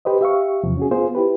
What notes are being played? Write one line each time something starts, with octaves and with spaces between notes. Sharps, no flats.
G4 B4 C5 D#5
G4 E5 F5 C#6
E2 C3 F3
C#4 F#4 G#4
B3 F4 G#4 C5
E4 G4 B4